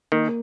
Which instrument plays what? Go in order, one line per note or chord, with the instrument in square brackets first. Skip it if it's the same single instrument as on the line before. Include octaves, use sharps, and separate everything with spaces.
[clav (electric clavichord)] D#3 [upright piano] A#3